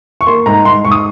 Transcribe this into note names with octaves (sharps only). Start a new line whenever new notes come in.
C#6
A#3 C6
G#2 A#5
G#2 C6
G#2 C#6
D#6